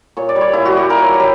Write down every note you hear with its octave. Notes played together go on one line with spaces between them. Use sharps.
A#2 C#5
D5
G3
C#5
A#2 E4
F#4
G3 G4
A#2 A#4
C#5
F#3
C#5
G4